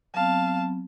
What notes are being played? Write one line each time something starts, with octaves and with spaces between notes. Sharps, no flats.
F#3 B3 C4 F5 A5